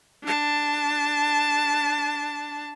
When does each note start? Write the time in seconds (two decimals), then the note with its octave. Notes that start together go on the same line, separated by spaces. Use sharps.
0.23 D4 A5